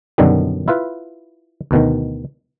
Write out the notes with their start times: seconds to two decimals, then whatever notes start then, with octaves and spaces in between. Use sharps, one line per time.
0.18 F#2 B2 D3 D#3 F#3 G3
0.68 E4 F4 B4
1.71 D2 B2 D#3